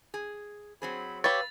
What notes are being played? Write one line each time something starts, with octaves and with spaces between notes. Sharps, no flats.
G#4
F#3 C4 G#4 C5 B5
G4 B4 C#5 F5 B5 E6 A6